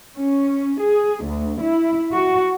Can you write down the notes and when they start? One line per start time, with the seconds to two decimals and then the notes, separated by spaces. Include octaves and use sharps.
0.16 C#4
0.81 G#4
1.24 D2
1.61 E4
2.12 F#4